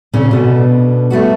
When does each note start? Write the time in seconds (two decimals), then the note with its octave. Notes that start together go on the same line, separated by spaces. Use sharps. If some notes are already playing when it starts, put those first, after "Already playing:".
0.13 A#2 C#3 C4 C#4
0.31 B2 D3 B3
1.10 G3 A3 B3 F#4